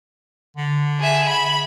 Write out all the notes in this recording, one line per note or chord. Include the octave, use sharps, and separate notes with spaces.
D3
G#4 E5
B5